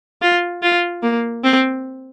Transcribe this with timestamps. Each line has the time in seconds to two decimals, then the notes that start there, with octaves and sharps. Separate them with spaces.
0.22 F4
0.63 F4
1.03 A#3
1.44 C4